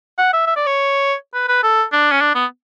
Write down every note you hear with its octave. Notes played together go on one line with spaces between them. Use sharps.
F#5
E5
E5
D5
C#5
B4
B4
A4
D4
C#4
D4
B3